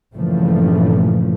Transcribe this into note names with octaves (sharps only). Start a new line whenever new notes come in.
G2 A#2 C#3 E3 F3 A3